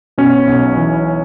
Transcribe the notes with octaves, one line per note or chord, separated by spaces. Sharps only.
B2 C#4
B1
E3